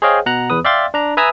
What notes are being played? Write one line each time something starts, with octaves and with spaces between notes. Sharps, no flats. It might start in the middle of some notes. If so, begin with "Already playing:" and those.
G#4 C5 C#5 D#5 F5 G5
B2 F#5 A#5 F#6
E2 B4 D#6
D5 E5 F5 G5 C6 A6
D4 A#5
B4 E5 G#5 A#5 D#6 E6